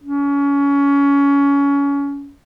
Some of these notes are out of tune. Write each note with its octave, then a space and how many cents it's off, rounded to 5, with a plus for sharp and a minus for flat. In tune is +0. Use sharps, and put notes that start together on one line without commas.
C#4 +25